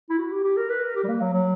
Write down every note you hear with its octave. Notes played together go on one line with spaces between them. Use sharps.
E4
F#4
G4
G4
A#4
B4
A#4
G4
G3
A#3
F#3
F#3